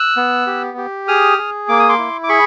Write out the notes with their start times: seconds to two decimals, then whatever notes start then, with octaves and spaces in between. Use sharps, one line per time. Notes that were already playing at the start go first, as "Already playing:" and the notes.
Already playing: E6 F#6
0.17 B3
0.47 G4
0.77 G4
1.08 G#4 D#6 F6
1.38 G#4
1.69 A#3 D6
1.79 D#6
1.89 C6 D6
1.99 E4
2.23 D6
2.29 G#4 B5 C#6